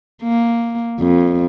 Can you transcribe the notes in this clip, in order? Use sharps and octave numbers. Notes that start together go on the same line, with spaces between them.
A#3
F2